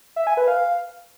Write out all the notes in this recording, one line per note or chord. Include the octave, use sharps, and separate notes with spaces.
E5
G#5
B4
F5